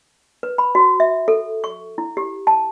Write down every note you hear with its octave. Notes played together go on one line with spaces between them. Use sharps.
B4
B5
F#4
E5
A4
C#6
E4
G4
A5